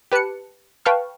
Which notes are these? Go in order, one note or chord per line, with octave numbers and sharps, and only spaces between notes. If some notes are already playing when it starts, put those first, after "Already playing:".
G4 B4 A5 F#6 C#7
B4 F5 G5 A5 C#6 F6